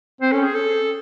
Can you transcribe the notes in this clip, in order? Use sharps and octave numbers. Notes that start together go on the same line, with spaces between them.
C4 C5
C#4 A4
G#4
A4